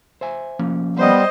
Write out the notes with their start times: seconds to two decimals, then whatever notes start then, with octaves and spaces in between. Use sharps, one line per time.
0.21 C5 E5 G#5
0.59 F3 A#3 C#4
0.97 G3 B3 C5 D#5